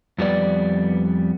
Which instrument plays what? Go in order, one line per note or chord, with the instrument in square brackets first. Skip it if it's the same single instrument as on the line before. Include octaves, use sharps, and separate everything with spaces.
[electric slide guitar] F2 G3 B3 D5